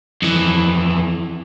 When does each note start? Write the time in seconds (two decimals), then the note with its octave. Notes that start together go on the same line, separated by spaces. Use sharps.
0.22 F2 E3